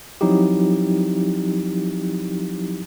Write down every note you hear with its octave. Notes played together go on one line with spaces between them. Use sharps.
F3 F#3 C4 D#4 E4 G4